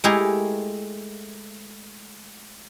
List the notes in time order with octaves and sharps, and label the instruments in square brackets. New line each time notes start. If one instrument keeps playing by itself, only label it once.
[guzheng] G#3 A3 E4 G4 G#4 A#4